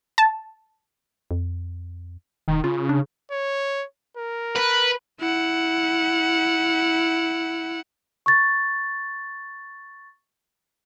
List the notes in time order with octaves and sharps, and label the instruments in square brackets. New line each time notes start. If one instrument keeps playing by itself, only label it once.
[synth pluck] A5
[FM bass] F2
[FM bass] E1 [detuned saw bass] D#3
[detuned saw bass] C#3 [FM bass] F4
[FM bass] D4
[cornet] C#5
A#4
[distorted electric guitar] B4
[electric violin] E4 F#5
[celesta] C#6 A6